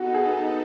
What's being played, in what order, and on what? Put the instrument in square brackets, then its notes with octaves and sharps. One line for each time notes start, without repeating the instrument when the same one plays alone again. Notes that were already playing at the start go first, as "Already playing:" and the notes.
Already playing: [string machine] B3 D#4 A4 [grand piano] F#4
[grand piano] G#4